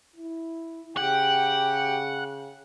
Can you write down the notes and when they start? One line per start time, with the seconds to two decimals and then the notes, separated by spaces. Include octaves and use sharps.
0.16 E4
0.97 C#3 G4 F#5 G5